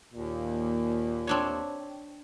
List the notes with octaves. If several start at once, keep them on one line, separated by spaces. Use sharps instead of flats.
D#2 A#2
C4 D4 C#5